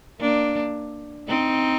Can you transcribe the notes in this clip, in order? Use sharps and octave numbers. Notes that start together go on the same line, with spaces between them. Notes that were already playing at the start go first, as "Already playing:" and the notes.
A#3 D4
C4 D#4